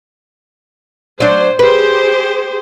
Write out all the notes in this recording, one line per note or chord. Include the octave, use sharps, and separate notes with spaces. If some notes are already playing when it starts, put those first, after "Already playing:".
F#3 D4 C5
G4 G#4 B4 C5